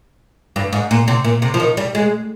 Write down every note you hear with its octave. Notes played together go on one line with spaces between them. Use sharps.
G2
G#2
A#2
C3
A#2
C3
F3
D#3
G3
G#3